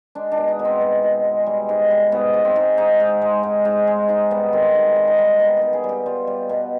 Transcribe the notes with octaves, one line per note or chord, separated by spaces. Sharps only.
G#3 D4
D4
B2
D#4
B2
C4
B2
B2
G#3
G3
G#2
G3
G#2 B3
G#2
C4
G#2
G#2 D#4
G#2
G#3
G#2
G#2
G#3
G#2 D#4
G3 B3
D#3 C4
G#2
G3
D#4
G3
B2 G4
B2 G4
G#4
G3
G4
G3 F4
G3
B2